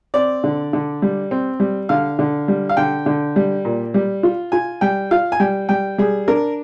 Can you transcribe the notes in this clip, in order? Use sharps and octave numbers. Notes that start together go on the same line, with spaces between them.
C4 D5
D3
D3
G3
C4
G3
D3 F5
D3
G3
F5
D3 G5
D3
G3
A#2
G3
F4
F4 G#5
G3 G5
F4 F5
G#5
G3 G5
G3 G5
G3 G#4
D4 A#4